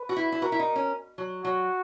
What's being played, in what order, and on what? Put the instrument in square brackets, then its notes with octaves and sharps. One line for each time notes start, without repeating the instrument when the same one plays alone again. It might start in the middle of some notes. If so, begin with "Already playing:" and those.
Already playing: [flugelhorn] B4
[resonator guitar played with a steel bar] F#4
E4
E4
[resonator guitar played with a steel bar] F#4 [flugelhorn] A#4
[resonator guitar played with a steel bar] E4
D#4
C#4
F#3
[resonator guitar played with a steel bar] F#3 [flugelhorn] F#4